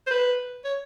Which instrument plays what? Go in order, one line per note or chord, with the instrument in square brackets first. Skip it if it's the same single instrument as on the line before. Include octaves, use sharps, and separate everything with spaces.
[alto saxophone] C5
B4
C#5